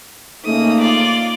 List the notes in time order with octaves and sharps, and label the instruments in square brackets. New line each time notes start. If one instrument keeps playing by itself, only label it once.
[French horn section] C#3 A3 D#4 [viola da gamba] A#3 [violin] D#6
[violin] F4 D5